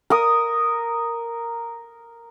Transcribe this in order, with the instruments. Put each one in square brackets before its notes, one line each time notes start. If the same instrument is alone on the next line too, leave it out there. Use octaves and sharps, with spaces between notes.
[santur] A#4 D#6